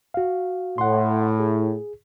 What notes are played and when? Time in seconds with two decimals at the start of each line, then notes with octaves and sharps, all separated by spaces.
0.14 F#4 F5
0.78 A2 F#5 C6
1.40 G#4